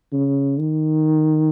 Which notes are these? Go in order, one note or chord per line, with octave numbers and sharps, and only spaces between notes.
C#3
D#3